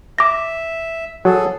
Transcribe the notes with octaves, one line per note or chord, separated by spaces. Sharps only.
E5 D6 A#6
F#3 G#4 A4